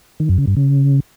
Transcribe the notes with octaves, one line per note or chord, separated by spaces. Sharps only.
D#3
F#2
C#3
G2
C#3